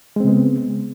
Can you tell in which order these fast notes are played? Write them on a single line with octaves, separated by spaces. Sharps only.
G#3 C4 C#3 B3